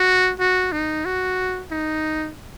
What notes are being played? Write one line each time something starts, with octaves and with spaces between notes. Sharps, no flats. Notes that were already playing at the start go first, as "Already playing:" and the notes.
Already playing: F#4
F#4
D#4
F#4
D#4